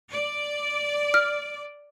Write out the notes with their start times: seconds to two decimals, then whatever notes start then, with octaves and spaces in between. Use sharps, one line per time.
0.12 D5
1.14 F6